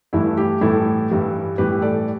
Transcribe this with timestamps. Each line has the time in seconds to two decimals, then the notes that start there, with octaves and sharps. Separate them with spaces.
0.13 G2 E3 A3 E4
0.37 G4
0.61 A2 E3 G3 E4 A4
1.10 G2 E3 G3
1.58 A2 E3 G3 G4 B4
1.82 A4 D5